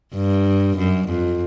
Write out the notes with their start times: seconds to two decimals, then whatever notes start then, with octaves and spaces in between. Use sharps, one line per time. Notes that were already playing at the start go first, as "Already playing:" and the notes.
0.15 G2
0.77 F#2
1.07 F2